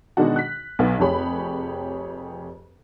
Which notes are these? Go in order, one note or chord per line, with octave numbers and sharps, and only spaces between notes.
B2 D#3 G#3 D4 F#4
F#6 B6
B1 B3
F1 F2 G4 G#4 C#5 B5